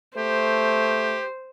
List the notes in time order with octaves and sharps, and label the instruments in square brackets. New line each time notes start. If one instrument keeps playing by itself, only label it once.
[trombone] A3 [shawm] G4 [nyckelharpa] C5